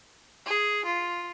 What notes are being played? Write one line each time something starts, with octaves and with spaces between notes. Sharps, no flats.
G#4
F4